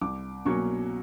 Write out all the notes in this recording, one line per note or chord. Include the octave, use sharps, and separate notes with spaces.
C2 D6
B2 F#3 A#3 C#4 C#6